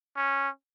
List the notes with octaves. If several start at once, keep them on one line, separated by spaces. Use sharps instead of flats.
C#4